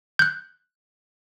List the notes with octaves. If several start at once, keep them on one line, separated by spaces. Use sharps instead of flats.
F#6 G6